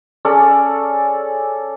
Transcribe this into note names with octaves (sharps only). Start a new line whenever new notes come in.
C#4 G#4 A4 D5